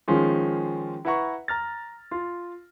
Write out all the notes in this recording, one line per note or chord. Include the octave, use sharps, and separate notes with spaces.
D#3 F3 G#3 C#4 F4
E4 B4 E5 F#5 A#5 C#6
A#5 F6 A6
F4